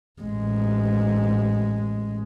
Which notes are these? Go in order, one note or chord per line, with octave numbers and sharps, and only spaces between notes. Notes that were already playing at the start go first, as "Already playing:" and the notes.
A1 G#3